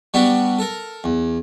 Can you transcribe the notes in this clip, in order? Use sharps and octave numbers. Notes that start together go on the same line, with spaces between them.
G3 B3 D4 F#4 B5
A4 A#4
E2